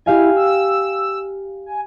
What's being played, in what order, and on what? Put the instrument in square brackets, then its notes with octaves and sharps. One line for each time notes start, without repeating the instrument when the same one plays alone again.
[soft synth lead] E4 [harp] G4 F5 G#5
[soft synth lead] E6
G#5